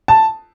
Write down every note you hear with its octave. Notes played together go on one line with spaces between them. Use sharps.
A5